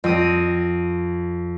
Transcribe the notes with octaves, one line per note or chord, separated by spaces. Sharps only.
F2 D#6 A#6